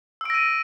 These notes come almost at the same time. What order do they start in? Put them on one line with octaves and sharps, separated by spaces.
E6 D7 A#6 D#7